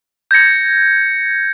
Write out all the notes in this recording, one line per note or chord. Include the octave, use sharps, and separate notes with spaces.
G6 G#6 A#6 C#7